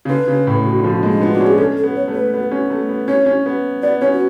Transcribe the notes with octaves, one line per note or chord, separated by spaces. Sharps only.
C#3
D3 B4
C#3
A2
B2
D3
F3
G#3
D4
B3 F4
D4 F#4
C#4
G#4
C#4 A4
A4
B3
C#5
A3
B4
B3
C#4
A3
B3
C#4 C#5
C#4
B3
B3 D5
C#4 C#5
F#4